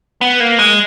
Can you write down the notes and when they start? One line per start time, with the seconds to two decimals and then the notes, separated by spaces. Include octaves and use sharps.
0.21 B3
0.40 A#3
0.59 G#3